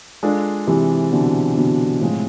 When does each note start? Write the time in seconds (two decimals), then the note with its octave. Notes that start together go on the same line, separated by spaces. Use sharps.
0.23 G#3 D4 F4 A4
0.67 C3 E3
1.12 B2 D3
1.57 B2 D3
2.01 A2 C3 F3 G#3